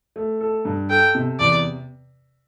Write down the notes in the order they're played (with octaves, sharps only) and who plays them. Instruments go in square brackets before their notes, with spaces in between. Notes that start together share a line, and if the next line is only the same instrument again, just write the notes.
[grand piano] A3
A4
G2
[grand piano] A4 [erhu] G5
[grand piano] C3
[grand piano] E2 [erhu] D5